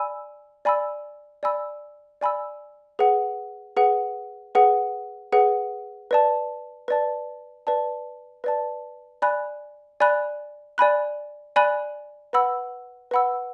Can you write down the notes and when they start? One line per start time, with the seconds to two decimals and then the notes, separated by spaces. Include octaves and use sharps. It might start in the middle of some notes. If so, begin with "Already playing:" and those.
Already playing: D5 G#5 B5 E6
0.65 D5 G#5 B5 E6
1.43 D5 G#5 B5 E6
2.21 D5 G#5 B5 E6
2.99 G#4 B4 F#5
3.77 G#4 B4 F#5
4.55 G#4 B4 F#5
5.32 G#4 B4 F#5
6.11 B4 D5 A5
6.88 B4 D5 A5
7.67 B4 D5 A5
8.44 B4 D5 A5
9.22 D5 G#5 B5 F#6
10.00 D5 G#5 B5 F#6
10.78 D5 G#5 B5 F#6
11.56 D5 G#5 B5 F#6
12.33 B4 F#5 B5 E6
13.11 B4 F#5 B5 E6